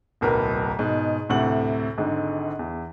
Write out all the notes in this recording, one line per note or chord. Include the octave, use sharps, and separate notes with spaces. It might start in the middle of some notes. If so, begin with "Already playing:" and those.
D1 B1 A#4 B4
G#2 B2
D2 A2 C3 F#5 F#7
G#1 G#2 D3
E2